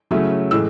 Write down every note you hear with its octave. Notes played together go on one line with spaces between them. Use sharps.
C#3 F#3 A3 C#4 E4
A2 E3 G#3 E6